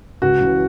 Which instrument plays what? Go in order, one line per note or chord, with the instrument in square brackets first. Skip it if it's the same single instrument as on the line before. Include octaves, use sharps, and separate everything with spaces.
[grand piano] C#2 F#4
C#3 E3